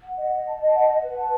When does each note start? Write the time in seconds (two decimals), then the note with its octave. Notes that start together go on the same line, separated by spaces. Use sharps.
0.04 F#5
0.17 D#5
0.32 D#5
0.47 A5
0.60 D#5
0.74 F#5
0.89 F#5
1.02 B4
1.18 A5